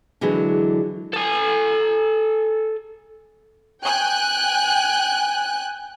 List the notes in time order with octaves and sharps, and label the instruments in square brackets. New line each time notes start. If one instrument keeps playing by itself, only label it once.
[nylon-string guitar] D3 E3 F#3 G#3 E4 G#4
[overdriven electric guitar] A4 G#5
[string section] G5 G#5 F#6